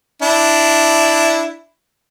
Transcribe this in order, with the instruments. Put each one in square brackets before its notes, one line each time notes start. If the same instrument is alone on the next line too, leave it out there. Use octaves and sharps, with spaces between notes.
[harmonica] D4 E4